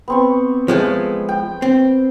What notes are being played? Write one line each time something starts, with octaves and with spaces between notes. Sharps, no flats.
B3 C4 C#6
F3 G#3 A3
G5
C4